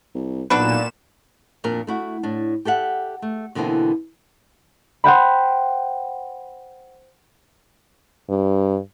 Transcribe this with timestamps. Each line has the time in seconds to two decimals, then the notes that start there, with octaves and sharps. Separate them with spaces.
0.15 C2
0.50 B1 A#2 D4 F#4 B4 E7
1.64 F2 A#2 D4 A#4
1.87 A3 E4 F#4
2.23 A2 D4
2.65 G4 A4 E5 F#5
3.22 A3
3.55 B2 D3 E3 A#3 C4 E4
5.04 C5 F#5 G5 B5
8.30 G2